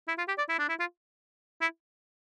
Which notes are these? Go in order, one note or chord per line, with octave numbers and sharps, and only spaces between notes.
E4
F4
G4
D5
E4
D4
E4
F4
E4